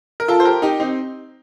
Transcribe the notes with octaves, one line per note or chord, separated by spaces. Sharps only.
A#4
F4 A4
C5
G4 A#4
D#4 G4
C4 D#4